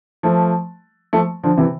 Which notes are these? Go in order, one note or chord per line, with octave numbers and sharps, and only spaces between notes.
F3 A3
F3 A3
D3 F3
C3 E3